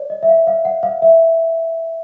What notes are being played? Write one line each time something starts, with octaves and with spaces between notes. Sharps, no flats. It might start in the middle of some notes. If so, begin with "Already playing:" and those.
Already playing: C#5 D5
D#5
E5
F5
F5
F#5
F5
E5